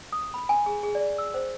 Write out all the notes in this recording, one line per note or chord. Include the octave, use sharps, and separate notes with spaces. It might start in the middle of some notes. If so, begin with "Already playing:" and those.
D#6
B5
G#5
G#4
G#4
D5
E6
C5